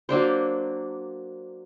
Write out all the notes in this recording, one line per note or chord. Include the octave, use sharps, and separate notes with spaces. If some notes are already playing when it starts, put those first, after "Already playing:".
F#3 A#3 D4 C5